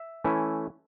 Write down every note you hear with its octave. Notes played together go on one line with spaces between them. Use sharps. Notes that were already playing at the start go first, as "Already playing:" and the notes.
Already playing: E5
E3 A3 C#4 E4 G#5